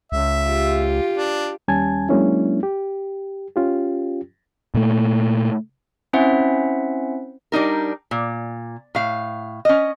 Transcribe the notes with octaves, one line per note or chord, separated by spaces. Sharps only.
C#2 E5
F4 G4
D4
D#2 G3 C#4 G#5 A5 G#6
F#3 G#3 A#3 C#4 D4 E4
G4
C#4 F4 G4
A#2 A3
C4 C#4 E4 C5 E5 F#5
G3 D4 D#4 A#4
A#2
A2 F5
C#4 D#5